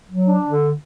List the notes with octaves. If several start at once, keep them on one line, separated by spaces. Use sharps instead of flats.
F#3
D4
D3